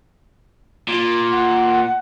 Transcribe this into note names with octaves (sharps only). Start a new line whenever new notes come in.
A#2
F#5